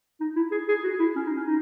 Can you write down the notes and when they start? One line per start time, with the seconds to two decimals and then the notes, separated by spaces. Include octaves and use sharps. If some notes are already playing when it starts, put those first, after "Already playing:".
0.20 D#4
0.36 E4
0.51 G#4
0.68 G#4
0.83 F#4
0.99 E4
1.16 C#4
1.26 D#4
1.36 C#4
1.46 D#4